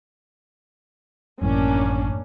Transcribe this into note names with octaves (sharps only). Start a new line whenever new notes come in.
G#1 F#2 A2 E3 A#3 C#4 D4